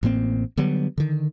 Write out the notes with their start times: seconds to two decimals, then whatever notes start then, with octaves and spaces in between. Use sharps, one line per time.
0.03 A1 A2 A#3 C4
0.57 D3 F#3 G3 B3
0.98 D3 D#3